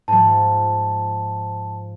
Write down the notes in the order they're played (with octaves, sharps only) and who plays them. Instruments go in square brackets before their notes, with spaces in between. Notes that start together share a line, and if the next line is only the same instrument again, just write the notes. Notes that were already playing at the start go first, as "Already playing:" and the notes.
[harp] G#2 F3 [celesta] A5